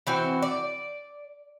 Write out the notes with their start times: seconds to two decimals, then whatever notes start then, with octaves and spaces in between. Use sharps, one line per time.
0.07 E3 C4 F#4
0.42 D5